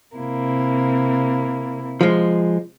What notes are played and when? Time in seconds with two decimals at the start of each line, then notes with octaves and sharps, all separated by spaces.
0.15 C3 A#3 E4
2.01 F3 G#3